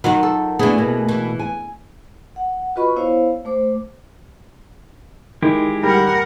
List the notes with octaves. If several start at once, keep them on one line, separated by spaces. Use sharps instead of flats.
D#3 F#3 F4 F#4
A4
E3 A3 B3 D4 G#4
B2 A#3
E3
G#5
F#5
F4 F#4 B4 D#5 B5 C#6
B3 E4 C5 C#5 F5
A3 C5 D6
D#3 G#3 E4 G4
G3 A#4 F#5